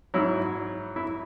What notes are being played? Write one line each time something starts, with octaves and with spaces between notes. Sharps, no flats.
G#2 F#3 E4
E4